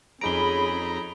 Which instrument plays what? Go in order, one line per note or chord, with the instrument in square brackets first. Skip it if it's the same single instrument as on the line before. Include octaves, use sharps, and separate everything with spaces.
[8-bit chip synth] F2 D#4 A#5 [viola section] C#4 G#4 B5 [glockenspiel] D7 G7